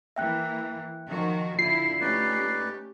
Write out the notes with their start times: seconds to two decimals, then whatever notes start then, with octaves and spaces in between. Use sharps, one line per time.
0.16 E3 A#3 E5 G5 F#6
1.07 D#3 F3 F#4
1.59 D3 E4 F4 C7
2.01 A3 C#4 D#4 G4 B4 D5